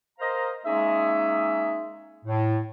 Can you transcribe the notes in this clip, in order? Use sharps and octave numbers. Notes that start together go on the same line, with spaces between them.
A#4 C5 D#5 F5 A#5
G#3 A#3 C#4 D#4 G#4 E5
A2